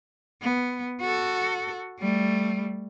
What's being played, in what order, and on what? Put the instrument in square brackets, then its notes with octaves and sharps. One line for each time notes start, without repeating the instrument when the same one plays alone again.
[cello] B3
F#4 A4
G3 A3